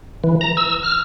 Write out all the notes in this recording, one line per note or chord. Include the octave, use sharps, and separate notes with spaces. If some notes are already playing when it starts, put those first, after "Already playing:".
E3
A#5
E6
F6